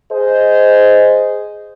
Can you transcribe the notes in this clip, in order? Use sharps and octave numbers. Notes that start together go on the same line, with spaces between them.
G#4 C5 D#5